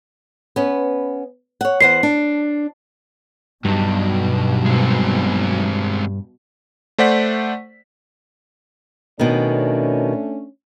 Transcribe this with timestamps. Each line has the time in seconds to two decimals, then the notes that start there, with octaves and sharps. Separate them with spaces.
0.56 B3 C#4
1.61 C#5 F#5
1.81 E2 C5 F#5 C7
2.03 D4
3.65 G2 B2 F#3 D#4
4.66 G#3 C4
6.98 A3 C5 D5 F#5 B6
9.20 B2 D#3 A3 C#4 D4